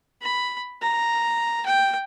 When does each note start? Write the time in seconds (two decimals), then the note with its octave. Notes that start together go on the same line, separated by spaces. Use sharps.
0.22 B5
0.82 A#5
1.66 G5